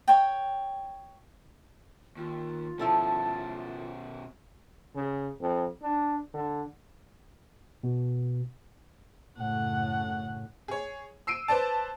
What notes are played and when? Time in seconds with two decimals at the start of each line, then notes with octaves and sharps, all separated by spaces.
0.08 C#5 G5
2.17 D#2 F4
2.79 B2 F3 C#4 E4 A4
4.95 C#3
5.41 F2
5.82 D4
6.34 D3
7.83 B2
9.37 F#2 A2 C#3 F#5
10.68 G#4 C#5
11.27 E6 C7 D7 D#7
11.48 B4 C5 D5 A5